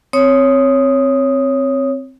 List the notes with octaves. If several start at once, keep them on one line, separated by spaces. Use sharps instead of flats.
C4 C#5 D#6